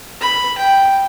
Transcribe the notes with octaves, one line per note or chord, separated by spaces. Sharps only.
B5
G5